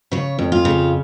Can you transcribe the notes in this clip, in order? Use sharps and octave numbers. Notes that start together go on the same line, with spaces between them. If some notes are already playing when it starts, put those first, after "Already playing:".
C#3 C#5
F2
F4
C#3